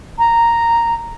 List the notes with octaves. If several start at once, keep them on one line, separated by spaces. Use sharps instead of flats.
A#5